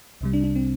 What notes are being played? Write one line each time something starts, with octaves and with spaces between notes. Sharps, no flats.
C2 C3 G3
D4
D4
C4